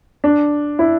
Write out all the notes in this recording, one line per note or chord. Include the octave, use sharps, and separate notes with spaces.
D4
E4